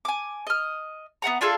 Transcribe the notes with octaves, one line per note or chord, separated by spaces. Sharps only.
G#5 D6
D#5 F6
B3 D#5 F#5 A#5
D4 F4 G#4 A4